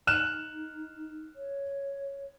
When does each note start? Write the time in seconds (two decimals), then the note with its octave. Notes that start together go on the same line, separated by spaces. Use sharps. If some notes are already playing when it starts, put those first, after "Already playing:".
0.07 D#4 F6 F#6 E7
1.36 C#5